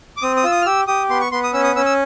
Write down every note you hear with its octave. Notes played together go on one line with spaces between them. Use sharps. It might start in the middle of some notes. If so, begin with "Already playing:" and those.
D6
C4 D#6
D#6
F4 E6
D#6
F6
G4 E6
G4 D#6
B3 C6
C#6
B3 C6
D#6
C#4 E6
D#6
C#4 E6
E6